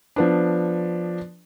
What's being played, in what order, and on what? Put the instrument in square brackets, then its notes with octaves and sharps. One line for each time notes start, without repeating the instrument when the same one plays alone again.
[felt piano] F3 B3 D4